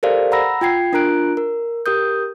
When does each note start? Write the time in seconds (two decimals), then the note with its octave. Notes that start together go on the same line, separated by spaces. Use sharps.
0.03 G4 A4 A#4 C5 D5 F5
0.32 F#5 A#5 B5 E6 A#6
0.61 F4 G5 G#6 C7
0.93 D4 F4 A#4 A#5 F#6 D7
1.37 A#4
1.86 G4 A#4 D#6 G6